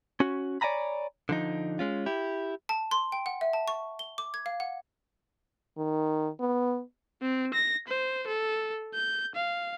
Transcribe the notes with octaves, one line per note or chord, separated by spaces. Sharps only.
C#4 F#4
C#5 D5 F#5 G#5 A#5 B5
D3 F3 D#4
G#3 C#4 F4
E4 G4
A5
C6
G5
F#5
E5
A5
C#6
G7
D6
G#6
F5
F#5
D#3
B3
C4
A#6
C5
A4
G6
F5